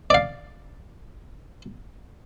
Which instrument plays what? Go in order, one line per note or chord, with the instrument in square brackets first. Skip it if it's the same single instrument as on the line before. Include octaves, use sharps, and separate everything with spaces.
[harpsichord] D5 F5